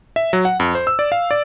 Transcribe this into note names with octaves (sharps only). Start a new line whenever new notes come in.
E5
F#3
F#5
F2
C5
E6
D5
F5
D5